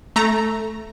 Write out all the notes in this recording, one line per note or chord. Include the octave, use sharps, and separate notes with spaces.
A3 A#5